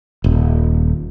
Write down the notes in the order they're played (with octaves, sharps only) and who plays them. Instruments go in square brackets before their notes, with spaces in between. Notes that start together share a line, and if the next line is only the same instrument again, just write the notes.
[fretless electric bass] D#1